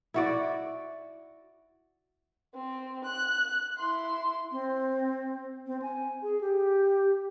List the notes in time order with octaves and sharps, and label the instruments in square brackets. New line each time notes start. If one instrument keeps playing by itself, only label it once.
[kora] E4 F#4 D5
[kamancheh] C4
F#6
E4 C6
[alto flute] C4
C4
G#5
G#4
G4